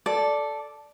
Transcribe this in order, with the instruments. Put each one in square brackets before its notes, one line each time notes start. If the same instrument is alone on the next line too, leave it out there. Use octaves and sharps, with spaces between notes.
[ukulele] A4 [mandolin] D5